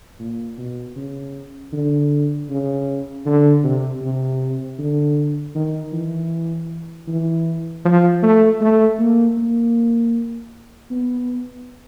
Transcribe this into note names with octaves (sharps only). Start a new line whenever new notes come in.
A#2
B2
C#3
D3
C#3
D3
C3
C3
D3
D#3
E3
E3
F3
A3
A3
A#3
A#3
B3